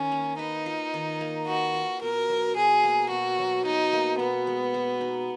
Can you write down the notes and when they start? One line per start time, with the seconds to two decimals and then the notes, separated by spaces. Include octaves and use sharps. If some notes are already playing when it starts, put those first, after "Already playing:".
Already playing: D#3 C#4
0.12 A#3
0.39 D#4 B4
0.66 F4
0.94 D#3
1.21 A#3
1.47 F#4 B4
1.74 F4
2.02 B2 A#4
2.29 F#3
2.56 B2 G#4
2.84 A#3
3.10 B2 F#4
3.39 F#3
3.65 B2 D#4
3.93 A#3
4.19 B2 B3
4.47 G#3
4.74 F#4
5.01 D#4